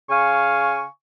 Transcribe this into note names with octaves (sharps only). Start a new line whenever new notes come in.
C#3 F5 G#5 C#6